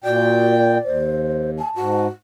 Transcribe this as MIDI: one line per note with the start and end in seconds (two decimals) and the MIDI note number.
0.04 0.78 46
0.04 0.53 66
0.04 1.00 74
0.04 0.78 79
0.85 1.60 39
0.85 1.51 72
1.59 1.69 80
1.59 2.05 81
1.76 2.07 44
1.76 2.07 66